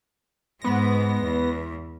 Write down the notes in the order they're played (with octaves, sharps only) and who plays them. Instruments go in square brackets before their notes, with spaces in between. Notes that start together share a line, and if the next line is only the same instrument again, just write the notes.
[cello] G#2 G#3 [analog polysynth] B3 A#6
[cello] E2